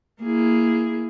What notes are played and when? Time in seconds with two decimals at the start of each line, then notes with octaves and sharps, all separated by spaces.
0.22 A#3 E4 G#4